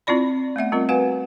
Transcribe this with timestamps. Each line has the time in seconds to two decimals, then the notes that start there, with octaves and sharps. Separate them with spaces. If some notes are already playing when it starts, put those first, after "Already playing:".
0.07 C4 E4 F4 D5 B5
0.56 A3 B3 E5 F#5
0.72 G3 C4 F4 A#4
0.89 F#4 B4 F5 F#5 G#5